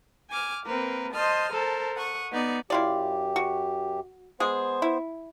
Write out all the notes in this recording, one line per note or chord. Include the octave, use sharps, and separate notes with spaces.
G#5 D6 F6
A#3 C4 A#4 B4
C5 D#5 A5 C6 D#6 F6
A4 A#4 C5 A5
F#5 C#6 D#6
B3 D#4 D5
F#2 E4 F4 G4 D5
F#4
G#3 B3 G#4 C5
E4